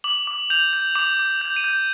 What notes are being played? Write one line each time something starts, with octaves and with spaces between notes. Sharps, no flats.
D6 F#7
D6
G6 F7
G6
D6 F7
D6
G6
D#7
G6